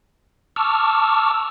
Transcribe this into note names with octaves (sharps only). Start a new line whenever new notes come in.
A5 C#6 D6 E6 F6